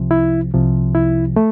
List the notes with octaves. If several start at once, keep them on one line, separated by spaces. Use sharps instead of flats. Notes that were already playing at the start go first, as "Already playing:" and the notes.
Already playing: C2 C3 F3
E4
C2 C3 F3
E4
A3